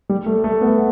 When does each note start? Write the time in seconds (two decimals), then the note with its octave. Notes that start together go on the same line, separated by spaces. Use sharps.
0.09 G3
0.26 A3
0.44 A3
0.61 B3